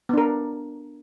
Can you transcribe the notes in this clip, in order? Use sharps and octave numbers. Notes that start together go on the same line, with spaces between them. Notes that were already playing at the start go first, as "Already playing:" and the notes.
B3 D4 A#4